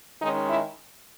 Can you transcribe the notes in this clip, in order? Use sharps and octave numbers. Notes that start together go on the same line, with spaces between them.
D#3 G#3 C#4 D#4
E4